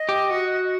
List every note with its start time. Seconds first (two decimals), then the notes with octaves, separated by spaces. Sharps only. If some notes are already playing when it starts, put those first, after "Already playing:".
Already playing: D#5
0.09 G4
0.30 F#4